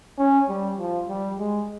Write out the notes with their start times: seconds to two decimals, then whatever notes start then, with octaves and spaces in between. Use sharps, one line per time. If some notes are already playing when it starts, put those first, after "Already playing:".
0.18 C#4
0.49 G3
0.79 F3
1.09 G3
1.39 G#3